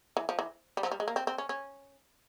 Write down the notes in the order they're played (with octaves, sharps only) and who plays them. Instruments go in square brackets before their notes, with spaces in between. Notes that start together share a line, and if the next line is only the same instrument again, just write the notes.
[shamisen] E3
F3
E3
G3
F3
G3
G#3
A#3
C4
C4
C#4
C#4